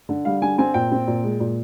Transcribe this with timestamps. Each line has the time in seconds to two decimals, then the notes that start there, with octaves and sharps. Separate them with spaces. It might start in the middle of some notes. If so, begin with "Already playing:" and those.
0.09 D3
0.25 G3 F5
0.42 D3 G#5
0.58 C4 G#5
0.74 A#2 G5
0.91 C4
1.07 A#2
1.24 G#3
1.40 A#2